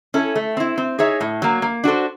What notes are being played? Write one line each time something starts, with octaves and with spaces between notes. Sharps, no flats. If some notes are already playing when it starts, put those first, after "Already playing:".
C#4 E4 A4
A3
C4 E4
C4
D#4 G#4 C#5 E5
A2
F#3 A#3
A#3
D4 F#4 A4 C5